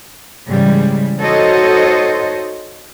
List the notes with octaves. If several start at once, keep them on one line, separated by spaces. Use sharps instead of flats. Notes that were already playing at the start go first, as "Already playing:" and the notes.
G#2 C#3 E3 G3
D#4 F#4 A4 C5 C#5 D#5